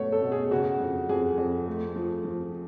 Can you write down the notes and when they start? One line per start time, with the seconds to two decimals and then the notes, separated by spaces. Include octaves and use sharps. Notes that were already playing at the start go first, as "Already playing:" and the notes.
Already playing: B2 A3 C#5
0.12 A4
0.22 B2
0.32 G#4
0.51 C#3 F#4
0.80 F2
1.09 F2 G#4
1.38 F2
1.68 A3
1.96 F3
2.25 F3